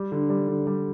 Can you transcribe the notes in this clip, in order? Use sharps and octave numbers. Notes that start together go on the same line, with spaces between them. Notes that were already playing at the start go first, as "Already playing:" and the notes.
Already playing: G3
D3
G3
D3
G3